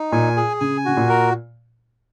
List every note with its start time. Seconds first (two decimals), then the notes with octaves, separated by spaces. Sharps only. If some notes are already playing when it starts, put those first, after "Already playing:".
Already playing: D#4
0.12 A#2 G#5
0.37 G#4
0.60 C#3 G#5
0.85 C#3 F#4
0.97 A#2
1.09 A#4